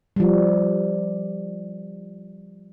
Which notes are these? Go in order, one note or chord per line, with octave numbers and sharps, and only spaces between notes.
F3 G3